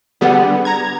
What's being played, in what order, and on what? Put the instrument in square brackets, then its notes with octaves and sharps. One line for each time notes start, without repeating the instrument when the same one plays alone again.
[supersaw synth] D3 G3 B3 [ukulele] G#4 F#5
[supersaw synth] A#5 G#6